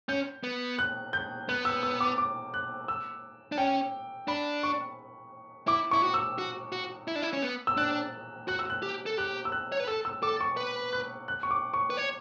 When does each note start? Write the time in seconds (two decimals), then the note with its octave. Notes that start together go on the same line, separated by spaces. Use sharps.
0.08 C#4 G6
0.44 B3
0.78 F#6
1.13 G6
1.49 B3 F#6
1.65 E6
1.83 E6
2.01 D6
2.18 D6
2.54 F#6
2.88 E6
3.52 D4
3.57 C#4 G5
4.28 D4 B5
4.63 C#6
5.67 E4 D6
5.91 E4 C#6
6.03 F#4
6.14 E6
6.38 F#4
6.72 F#4
7.08 E4
7.16 D4
7.22 E4
7.33 C#4
7.42 B3
7.67 E6
7.77 D4 F#6
8.48 F#4 F#6
8.59 E6
8.70 F#6
8.83 G4
9.06 A4
9.17 G4 F#6
9.45 E6
9.52 F#6
9.72 C#5
9.80 B4
9.88 A4 E6
10.05 E6
10.23 A4 D6
10.41 C#6
10.57 B4
10.93 F#6
11.28 F#6
11.43 C#6
11.51 D6
11.74 C#6
11.90 B4
11.97 C#5